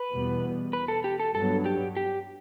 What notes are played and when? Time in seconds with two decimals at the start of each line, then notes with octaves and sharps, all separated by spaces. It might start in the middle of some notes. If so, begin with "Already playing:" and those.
Already playing: B4
0.12 E2 B2 G3 B3
0.73 B4
0.88 A4
1.04 G4
1.20 A4
1.35 G2 F#3 B3 A4
1.66 G4
1.97 G4